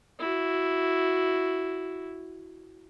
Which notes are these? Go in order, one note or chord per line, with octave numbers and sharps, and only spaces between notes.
E4 F#4